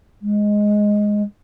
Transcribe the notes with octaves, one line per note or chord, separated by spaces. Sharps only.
G#3